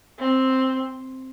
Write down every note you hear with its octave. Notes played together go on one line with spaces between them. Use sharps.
C4